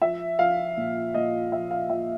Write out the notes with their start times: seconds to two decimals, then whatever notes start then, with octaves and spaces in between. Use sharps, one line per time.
0.02 F3 E5
0.39 F3 F5
0.77 A#2
1.14 A#2 D#5
1.52 F3 E5
1.71 F5
1.90 F3 E5